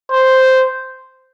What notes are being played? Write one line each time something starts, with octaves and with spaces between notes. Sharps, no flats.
C5